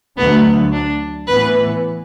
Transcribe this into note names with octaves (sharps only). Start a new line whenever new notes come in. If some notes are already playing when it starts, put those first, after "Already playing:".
D2 D3 F#3 A3 B3
D4
A2 E3 B3 B4